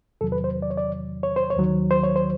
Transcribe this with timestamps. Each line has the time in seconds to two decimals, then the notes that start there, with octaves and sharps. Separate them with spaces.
0.21 E2 C3 D#3 F#3 A4
0.32 B4
0.44 C5
0.62 D5
0.70 C#5
0.77 D5
1.23 C#5
1.36 C5
1.50 C#5
1.56 D#2 D#3 F#3
1.91 C5
2.04 C#5
2.16 C5